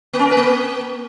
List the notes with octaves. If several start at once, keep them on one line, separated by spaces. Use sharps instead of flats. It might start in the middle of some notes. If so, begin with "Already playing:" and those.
A#3
C#4
A#4
B4
A#3